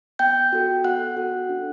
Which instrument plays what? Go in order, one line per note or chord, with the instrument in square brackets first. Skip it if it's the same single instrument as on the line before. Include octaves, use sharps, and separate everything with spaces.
[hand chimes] B3 G5 G6
F#4 A4
B3 F#5 F#6
F#4 A4
D4